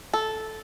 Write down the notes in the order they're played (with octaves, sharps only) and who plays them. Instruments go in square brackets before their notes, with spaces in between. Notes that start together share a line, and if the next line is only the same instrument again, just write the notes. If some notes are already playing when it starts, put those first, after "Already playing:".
[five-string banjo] A4